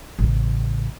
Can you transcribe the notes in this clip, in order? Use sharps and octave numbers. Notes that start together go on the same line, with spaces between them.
A1 C#3